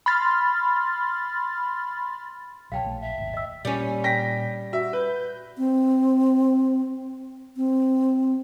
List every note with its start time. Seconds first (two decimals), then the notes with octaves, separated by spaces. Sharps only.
0.06 B5 C6 F6 A6
2.72 C#2 B2 F#3 C#5 F5 G5 A5
2.84 A#1 A3
3.00 E5
3.18 G#1 D#2
3.34 D#5 E6
3.65 A#2 G3 C#4
4.04 G5 A#6 B6
4.73 F#4 E5
4.93 B4 G6
5.58 C4
7.57 C4